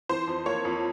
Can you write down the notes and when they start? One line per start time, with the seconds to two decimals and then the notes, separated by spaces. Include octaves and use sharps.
0.09 E3 C5
0.27 F2
0.46 A#3 C#5
0.65 F2